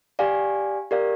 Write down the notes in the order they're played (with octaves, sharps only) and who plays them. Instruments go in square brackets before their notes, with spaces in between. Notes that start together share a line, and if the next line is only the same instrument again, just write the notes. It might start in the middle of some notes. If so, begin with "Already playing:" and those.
[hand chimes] G4 D5 F5 G#5
G4 A#4 D5 F5